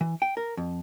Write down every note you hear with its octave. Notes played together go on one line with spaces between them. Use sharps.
E3
G5
A#4
F2